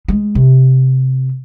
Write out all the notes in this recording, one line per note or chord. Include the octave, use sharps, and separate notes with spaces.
G#3
C3